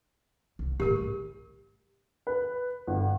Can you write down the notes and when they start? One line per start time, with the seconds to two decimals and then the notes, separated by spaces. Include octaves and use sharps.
0.59 C2
0.80 A1 C#3 G4 A#4
2.27 B4
2.87 G1